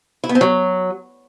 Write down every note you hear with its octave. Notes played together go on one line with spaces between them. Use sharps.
E4
B3
C4
F#3